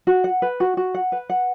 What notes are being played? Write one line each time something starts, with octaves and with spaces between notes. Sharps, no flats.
F#4
F#5
B4
F#4
F#4
F#5
B4
F#5